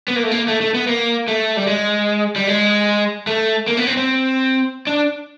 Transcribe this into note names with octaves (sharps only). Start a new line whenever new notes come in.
B3
A#3
A3
A#3
A3
A3
B3
A#3
A3
G3
G#3
G3
G#3
A3
A#3
B3
C4
C4
D4